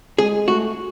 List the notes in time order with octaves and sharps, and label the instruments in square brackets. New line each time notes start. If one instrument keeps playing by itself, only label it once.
[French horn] G#3 [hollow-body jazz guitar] G#4
[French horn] A3 [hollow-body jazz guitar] F#4